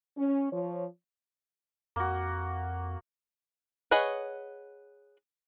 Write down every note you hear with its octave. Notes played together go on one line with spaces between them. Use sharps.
C#4
F3 C#5
F2 A#3 F#4
G#4 B4 C#5 D#5 F#5